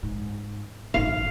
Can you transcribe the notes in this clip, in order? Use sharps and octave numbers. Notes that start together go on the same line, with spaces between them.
G#2
G#1 D#3 F5